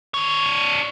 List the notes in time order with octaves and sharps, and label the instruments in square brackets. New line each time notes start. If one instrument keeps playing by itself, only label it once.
[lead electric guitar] D4 C#5